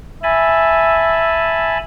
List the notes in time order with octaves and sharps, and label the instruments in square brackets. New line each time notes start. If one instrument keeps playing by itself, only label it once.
[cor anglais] E5 [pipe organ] G#5 A5 B5